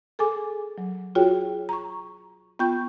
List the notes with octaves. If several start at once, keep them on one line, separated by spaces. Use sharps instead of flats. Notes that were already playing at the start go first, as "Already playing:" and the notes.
G#4 A4 G#5 D6
F#3
F4 F#4 G#4 C#5 G5
A#5 C#6
B3 F4 G5 C#6 G6